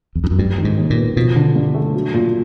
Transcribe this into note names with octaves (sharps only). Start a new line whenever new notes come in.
E2
F2
F#2
G2 G3
D#3
G#2
D#2
A#2
B3
B2 F3
D3
G2
A3
F#3
A#2